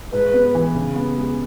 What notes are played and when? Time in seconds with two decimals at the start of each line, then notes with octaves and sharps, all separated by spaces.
0.12 G#2 B4
0.34 B3
0.55 E3
0.75 C#3
0.96 B3
1.17 G#3